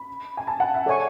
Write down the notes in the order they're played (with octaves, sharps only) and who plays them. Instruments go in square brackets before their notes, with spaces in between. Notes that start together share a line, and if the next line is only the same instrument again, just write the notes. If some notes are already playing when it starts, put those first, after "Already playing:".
Already playing: [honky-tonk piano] B5
G#5
A5
F#5
E5
[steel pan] A4 C#5 G#5 C#6 [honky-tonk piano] D5